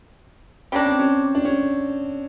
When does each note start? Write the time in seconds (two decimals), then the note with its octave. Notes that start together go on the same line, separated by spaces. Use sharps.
0.72 G3 A#3 C#4 D4
0.85 C4
0.99 C#4
1.35 D4
1.45 C#4